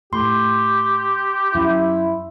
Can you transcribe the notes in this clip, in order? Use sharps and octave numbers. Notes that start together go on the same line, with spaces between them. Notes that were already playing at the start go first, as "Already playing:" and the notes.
A2 G4 C6
F#2 E4